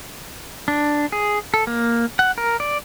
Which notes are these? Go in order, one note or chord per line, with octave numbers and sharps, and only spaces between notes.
D4
G#4
A4
A#3
F#5
A#4
D5